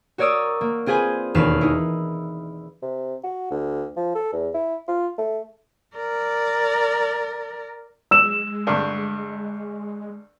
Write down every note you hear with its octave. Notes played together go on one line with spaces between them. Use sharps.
F#4 A#4 C#5 D5 D#6 E6
A#3
C4 F4 G#4 B4 C5 G#5
E1 D#2 B4 F6 C7 E7
D#4 E4
C3
F#4
D2
F3
A4
E2
E4
F4
A3
A#4 D5
G#3 E6 E7
D2 G2